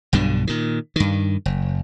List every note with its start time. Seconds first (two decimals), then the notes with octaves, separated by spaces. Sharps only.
0.13 B1 G2 B2 D3
0.47 A#2 D#3
0.96 G2 D#3
1.46 F#1